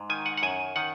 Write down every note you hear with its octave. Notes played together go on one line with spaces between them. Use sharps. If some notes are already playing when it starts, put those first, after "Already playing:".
Already playing: G#2
D#3 G#5
F#5
F#5
F#2 G#5
D#3 F#5